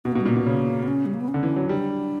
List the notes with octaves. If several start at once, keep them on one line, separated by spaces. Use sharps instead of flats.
B2 B3
A#3
B2
G3
A#2 A#3
B2
C#3
B3
C#4
G3
A#3
B3
C#4
D3
E3
F#3
G3 D4